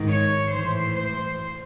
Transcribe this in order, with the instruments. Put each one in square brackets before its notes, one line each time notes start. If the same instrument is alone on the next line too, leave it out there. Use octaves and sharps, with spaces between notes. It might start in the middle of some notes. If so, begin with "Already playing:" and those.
Already playing: [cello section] G#2 D#3
C#5
A2 E3 C5
C5